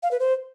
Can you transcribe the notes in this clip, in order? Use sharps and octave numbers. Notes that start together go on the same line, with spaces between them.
F5
B4
C5